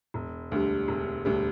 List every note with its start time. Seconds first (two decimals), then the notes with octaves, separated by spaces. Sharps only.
0.14 E1
0.52 D2 D3 G3
0.88 E1
1.25 D2 D3 G3